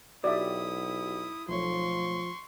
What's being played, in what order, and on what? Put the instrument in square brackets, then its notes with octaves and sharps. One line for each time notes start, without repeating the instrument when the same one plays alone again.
[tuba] B1 [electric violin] E4 D#6 [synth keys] F#4 G4 [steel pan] D5 E5
[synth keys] B1 A3 C#5 [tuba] F3 [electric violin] C6 C#6